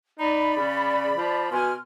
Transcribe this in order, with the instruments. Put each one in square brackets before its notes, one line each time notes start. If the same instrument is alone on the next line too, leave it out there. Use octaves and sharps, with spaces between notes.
[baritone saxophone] D#4 [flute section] D5 B5
[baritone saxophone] C#3
F3
[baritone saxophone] B2 [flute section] G#5 C6 F6